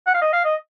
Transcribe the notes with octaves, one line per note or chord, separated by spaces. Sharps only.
F#5
F5
D#5
F5
D#5